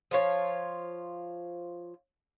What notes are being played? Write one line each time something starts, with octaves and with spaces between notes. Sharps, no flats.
F3 F4 C#5